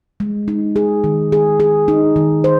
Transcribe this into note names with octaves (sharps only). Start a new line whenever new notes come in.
G#3
D#4
G#4
D#3
G#4
G#4
D#4
D#3
C5